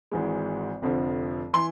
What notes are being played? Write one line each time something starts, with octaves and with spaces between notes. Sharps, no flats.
G#1 G#2 E3 G#3
F1 F2 D3 F3
E3 C6